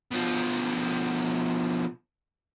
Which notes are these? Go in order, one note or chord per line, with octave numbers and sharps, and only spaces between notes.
B2 F3